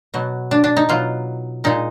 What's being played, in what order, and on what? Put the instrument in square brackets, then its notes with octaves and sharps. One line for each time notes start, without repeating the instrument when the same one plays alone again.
[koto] B2 F#3
D4
D4
D#4
B2 F#3 F4
A#2 G#3 D#4